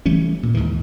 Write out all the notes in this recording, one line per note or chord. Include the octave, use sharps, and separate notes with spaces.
E3 G3 A3 C#4
A#2
D#2 G#2 D#3 E3